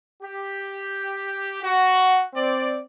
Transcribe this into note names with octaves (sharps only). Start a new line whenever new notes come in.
G4
F#4
C4 D5